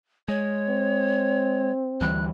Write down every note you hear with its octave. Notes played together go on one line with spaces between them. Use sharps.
G#3 C#5
C4
D2 E3 G3 F#6